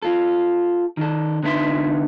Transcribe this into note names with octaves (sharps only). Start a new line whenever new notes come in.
F4 A4
D#3 A4
D3 B3 D#4 F4 E5 C6